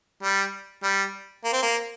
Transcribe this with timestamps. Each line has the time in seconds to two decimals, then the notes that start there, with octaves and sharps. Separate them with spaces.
0.23 G3
0.84 G3
1.45 A#3
1.53 C4
1.63 A#3